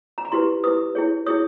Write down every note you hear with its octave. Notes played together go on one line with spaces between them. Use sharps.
A#5
B5
E4 G4 B4 C6
E4 G4 B4 D#6
E4 G#4 C#5
E4 G#4 C#5 D#6